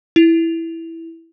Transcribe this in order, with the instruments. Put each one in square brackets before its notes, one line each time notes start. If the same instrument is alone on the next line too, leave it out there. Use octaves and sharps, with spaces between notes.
[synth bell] E4 F7